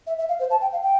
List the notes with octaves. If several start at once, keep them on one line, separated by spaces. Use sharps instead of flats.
E5
E5
F5
C5
A5
G5
F5
G5